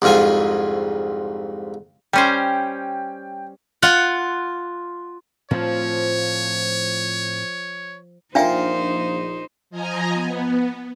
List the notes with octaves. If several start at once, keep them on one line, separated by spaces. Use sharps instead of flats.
C2 F2 G#2 F4 G#5
G3 C#4 C5 G5
F4 F#5
A2 F3 C4 C#5
A#1 D4 D#4 F4 A#4 C5 E5 G5
F3 D#5 G#5 A#5
B3